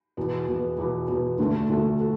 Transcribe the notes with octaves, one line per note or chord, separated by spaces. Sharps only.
E2 B2 B3
E2 B2 B3
E2 B2 B3
E2 B2 B3
D2 D3 A3 F#4 A4
D2 D3 A3 F#4 A4
F#4 A4